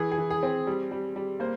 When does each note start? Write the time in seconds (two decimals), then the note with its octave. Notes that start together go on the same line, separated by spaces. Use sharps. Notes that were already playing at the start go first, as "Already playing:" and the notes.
Already playing: E3 G#4
0.12 G#4
0.18 E3
0.30 G#4
0.43 C4
0.67 G3
0.91 G3
1.16 G3
1.40 A#3 C5